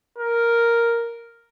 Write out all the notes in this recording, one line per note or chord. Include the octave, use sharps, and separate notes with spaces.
A#4